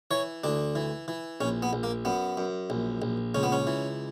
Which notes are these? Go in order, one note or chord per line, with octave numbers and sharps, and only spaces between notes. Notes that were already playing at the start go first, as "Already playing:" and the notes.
E3 C#5
D2 D4
E3
E3
A#1 C#4
B3
A#1
A#3
F#2 B3
F#2
A#1
A#1
C#2 C#4
B3
C#4
E3